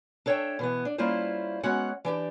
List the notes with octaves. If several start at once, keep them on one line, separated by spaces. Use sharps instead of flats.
D4 A4 C#5 D5 E5 G5
B2 E3 B3
D4
G3 A#3 C#4 E4 F4 C5
G#3 B3 C#4 F#4 C#5 F#5
E3 D4 G4